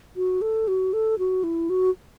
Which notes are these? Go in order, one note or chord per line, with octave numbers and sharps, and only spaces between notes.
F#4
A4
F#4
A4
F#4
E4
F#4